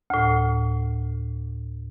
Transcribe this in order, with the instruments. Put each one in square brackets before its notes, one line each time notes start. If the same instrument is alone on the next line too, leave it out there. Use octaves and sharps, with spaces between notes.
[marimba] D2 A2